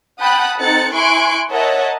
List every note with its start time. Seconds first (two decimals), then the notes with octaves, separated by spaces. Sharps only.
0.21 F#5 G5 A5 B5 D#6 F#6
0.59 C4 D#4 A4 F#6 A6 C#7
0.94 E4 G#5 C6 C#6 F#6 D7
1.51 A#4 C#5 D#5 E5 F#5 A5